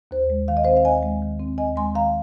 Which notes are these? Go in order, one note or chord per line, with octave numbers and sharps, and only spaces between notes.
D#2 C5
G#3
D#3 F5
D#5
C4 C5 F5
F5
D#2 D#5 G#5
G#3
D#3
C4
D#2 D#5 G#5
G#3 G#5 C6
D#3 F5 A#5